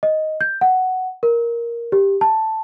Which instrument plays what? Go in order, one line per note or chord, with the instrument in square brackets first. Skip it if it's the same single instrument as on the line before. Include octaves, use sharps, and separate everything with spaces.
[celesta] D#5
G6
F#5
A#4
G4
A5